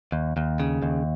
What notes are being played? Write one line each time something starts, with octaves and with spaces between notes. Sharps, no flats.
D#2
D#2
C#3
D#2